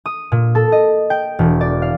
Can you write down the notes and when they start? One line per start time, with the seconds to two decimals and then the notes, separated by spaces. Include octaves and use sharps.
0.06 D#6
0.32 A#2
0.55 A4
0.72 D#5
1.10 G5
1.39 E1
1.61 D5
1.82 F5